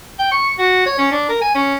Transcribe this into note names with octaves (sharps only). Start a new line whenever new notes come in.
G5
C#6
F#4
C#5
C#4
D4
A#4
G#5
C#4